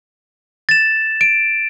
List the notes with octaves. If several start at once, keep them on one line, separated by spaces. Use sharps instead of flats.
A6 E7
D7